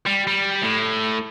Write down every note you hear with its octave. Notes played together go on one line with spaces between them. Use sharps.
G3
G3
A2